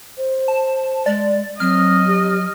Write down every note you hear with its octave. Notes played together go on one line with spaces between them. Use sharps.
C5
A5
G#3 D5
F#3 C4 D#5 F6
G4